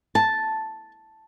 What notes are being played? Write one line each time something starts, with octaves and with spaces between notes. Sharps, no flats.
A5